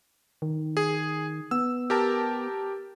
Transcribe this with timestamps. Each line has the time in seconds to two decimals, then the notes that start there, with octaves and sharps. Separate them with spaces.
0.42 D#3
0.77 G#4
1.51 B3 E6
1.90 G4 A#4 A5